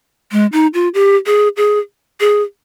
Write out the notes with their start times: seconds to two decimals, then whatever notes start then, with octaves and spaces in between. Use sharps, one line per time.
0.32 G#3
0.52 D#4
0.74 F4
0.94 G4
1.26 G#4
1.57 G#4
2.20 G#4